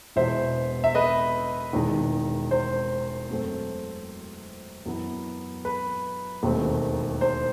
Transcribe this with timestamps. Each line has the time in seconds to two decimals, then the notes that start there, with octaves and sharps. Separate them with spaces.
0.16 E1 E2 B2 C5 E5
0.84 E5
0.95 B4 D#5
1.73 E1 E2 D#3
2.51 C5
3.30 F#2 F#3 A3 C4
4.86 F#2 E3 B3
5.65 B4
6.43 E1 D#2 D#3 A3 C4
7.21 C5